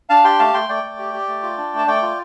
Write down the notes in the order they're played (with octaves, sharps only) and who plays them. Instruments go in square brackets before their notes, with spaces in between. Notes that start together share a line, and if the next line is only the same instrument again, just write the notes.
[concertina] D4 F5 A5
G4 G5 C6
A3 F5 A5
A3 G5 C6
A3 D5 G5
A3
G4
G4
A3
F4
D4
A3
A5
A3 D5 G5
F4